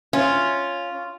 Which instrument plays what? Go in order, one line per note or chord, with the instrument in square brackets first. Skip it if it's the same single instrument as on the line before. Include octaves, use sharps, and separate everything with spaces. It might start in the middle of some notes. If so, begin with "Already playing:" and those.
[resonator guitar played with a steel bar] C#4 [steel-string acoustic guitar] F4